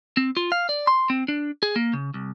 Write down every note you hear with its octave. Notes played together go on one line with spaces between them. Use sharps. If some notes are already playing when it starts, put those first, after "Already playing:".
C4
F4
F5
D5
C6
C4
D4
G#4
A#3
C#3
C2